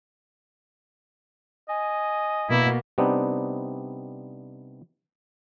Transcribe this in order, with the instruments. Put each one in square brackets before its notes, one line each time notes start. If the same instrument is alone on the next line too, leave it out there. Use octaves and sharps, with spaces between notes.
[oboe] D#5 [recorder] G#5
[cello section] B2 A#3 B3 [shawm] E4
[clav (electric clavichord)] C3 G3 B3 C4 D4 D#4